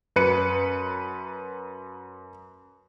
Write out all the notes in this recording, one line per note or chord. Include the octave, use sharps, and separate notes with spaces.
F#2 B4 C#7 D#7